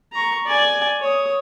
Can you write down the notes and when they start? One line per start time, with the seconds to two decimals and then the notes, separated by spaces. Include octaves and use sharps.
0.13 A#5 C#6
0.46 D5 G#5
1.00 C#5 D#6